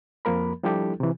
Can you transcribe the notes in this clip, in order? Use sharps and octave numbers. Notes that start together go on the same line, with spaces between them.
F2 F3 A#3 A#4 B5
F3 G3 D4 E4 G4 A4
C3 E3